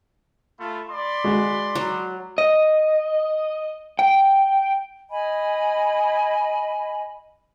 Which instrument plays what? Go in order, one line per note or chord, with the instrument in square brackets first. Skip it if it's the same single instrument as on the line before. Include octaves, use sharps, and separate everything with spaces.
[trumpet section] A3 F4 B5
D5 B5 C6
[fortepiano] G#3 F#4
[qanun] F#3
[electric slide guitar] D#5
G5
[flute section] D#5 G#5 B5